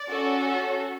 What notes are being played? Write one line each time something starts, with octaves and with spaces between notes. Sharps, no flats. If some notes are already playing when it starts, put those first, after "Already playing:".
Already playing: D5
C#4 F#4 A4